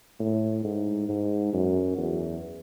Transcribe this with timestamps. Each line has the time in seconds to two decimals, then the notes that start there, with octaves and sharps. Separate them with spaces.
0.20 A2
0.64 G#2
1.09 G#2
1.53 F#2
1.97 E2